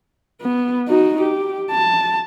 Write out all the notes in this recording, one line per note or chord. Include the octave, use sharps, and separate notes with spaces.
B3
D#4 F#4
G4
A5